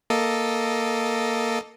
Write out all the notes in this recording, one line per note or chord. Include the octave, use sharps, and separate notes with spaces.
A#3 A4 D#5